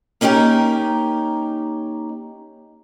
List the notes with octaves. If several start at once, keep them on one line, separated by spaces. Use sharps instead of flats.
A#3 C#4 D#4 G4 A#4